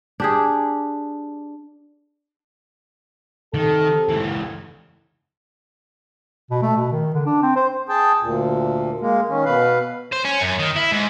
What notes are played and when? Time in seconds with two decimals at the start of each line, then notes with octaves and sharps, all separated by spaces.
0.20 D4 G4 G#4
3.54 C3 D#3 A4
4.09 C#2 E3
6.51 B2
6.62 A3
6.77 B2
6.92 D#3
7.14 D3
7.26 D4
7.43 C4
7.56 C5
7.89 G#4 G5 A5
8.21 D2 A#2
9.00 G#3 A#3
9.29 D#3 C#4
9.45 B2 B4 F5
10.13 C5
10.25 C#4
10.41 F#2
10.59 D#3
10.76 E4
10.91 G#2